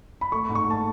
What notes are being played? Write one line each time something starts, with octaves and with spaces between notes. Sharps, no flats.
B5
A3 C#6
G#2
C#6
A3 A5